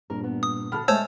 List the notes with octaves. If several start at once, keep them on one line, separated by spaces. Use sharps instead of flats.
G2 A#2 A#4
B3
D#6
D3 F#4 A4 B5 F6
G#3 A3 C5 C#5 G#5 A5 E6